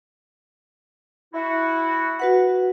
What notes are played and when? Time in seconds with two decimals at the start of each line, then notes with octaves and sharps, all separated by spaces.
1.34 E4 F#4
2.20 F#4 B4 F#5